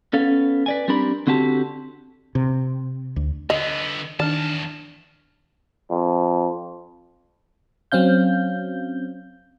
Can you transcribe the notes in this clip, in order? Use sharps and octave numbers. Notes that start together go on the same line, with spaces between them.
B3 C#4 A4 F5
B4 D5 G#5
G3 C4 D4 A#4 B5
D3 C4 F#4 G4 A5
C3
D2
D3 B3 D#5
E2 D#3 D4 D5 A5 F6 A6
F2
F#3 C4 C#4 F5 G6